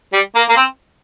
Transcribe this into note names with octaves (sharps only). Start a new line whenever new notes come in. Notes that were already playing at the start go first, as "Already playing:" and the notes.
G3
A#3
A#3
C4